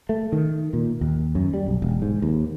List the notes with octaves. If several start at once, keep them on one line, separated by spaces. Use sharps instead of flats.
A3
D#3
A#2
D#2
F#2
G3
B1
E1
G#2
D#2